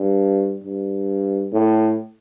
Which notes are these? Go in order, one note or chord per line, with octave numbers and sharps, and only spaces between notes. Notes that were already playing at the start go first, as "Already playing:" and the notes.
Already playing: G2
G2
A2